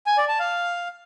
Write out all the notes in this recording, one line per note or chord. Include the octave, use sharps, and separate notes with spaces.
G#5
D5
A5
F5